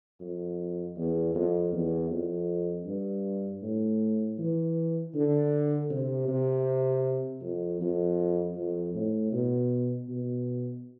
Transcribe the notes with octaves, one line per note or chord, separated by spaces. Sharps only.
F2
E2
F2
E2
F2
G2
A2
E3
D3
C3
C3
F2
F2
F2
A2
B2
B2